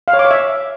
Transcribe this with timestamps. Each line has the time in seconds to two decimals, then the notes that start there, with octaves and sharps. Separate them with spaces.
0.08 F5
0.13 C#5
0.19 D6
0.25 C#5
0.31 E5